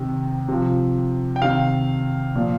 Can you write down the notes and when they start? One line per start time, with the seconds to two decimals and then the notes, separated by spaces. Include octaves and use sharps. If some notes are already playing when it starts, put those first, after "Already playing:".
Already playing: C3 D#3
0.48 C3 F3
1.36 G5
1.42 C3 D#3 F5
2.35 A#2 F3